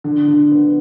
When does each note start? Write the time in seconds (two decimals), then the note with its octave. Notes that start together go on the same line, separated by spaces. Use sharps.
0.04 D3
0.27 D3
0.51 B3